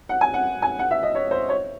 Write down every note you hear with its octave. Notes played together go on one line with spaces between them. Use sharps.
F#5
G#5
F#5
G#5
F#5
E5
D#5
C#5
C5
C#5